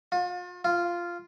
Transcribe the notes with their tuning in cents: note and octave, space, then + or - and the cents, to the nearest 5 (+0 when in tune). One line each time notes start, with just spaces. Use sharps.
F4 +35
F4 -10